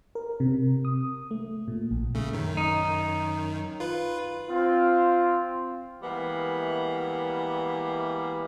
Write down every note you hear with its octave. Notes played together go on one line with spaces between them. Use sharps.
A#4
C3
D#6
A3
A#2
A#1
C#3 A3
F#2 D#3
D#4
F4 B4
C4 F4
E3 G3 G#3 A#3 B3